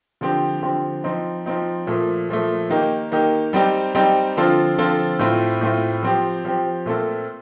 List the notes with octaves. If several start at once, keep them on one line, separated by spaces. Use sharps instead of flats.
D3 F3 C4 G4
D3 F3 C4 G4
F3 C4 D#4
F3 C4 D#4
A#2 F3 A3
A#2 F3 A3
D#3 A#3 D#4 G4
D#3 A#3 D#4 G4
G3 C4 D#4 G4
G3 C4 D#4 G4
D3 F3 C4 F4 A4
D3 F3 C4 F4 A4
A2 A3 C4 F4
A2 A3 C4 F4
F3 C4 G4
F3 C4 G4
A#2 A3 C4 F4 A4